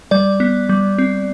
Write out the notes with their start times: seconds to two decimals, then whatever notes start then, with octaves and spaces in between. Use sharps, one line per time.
0.11 G3 D5
0.40 B3
0.69 G3
0.98 C4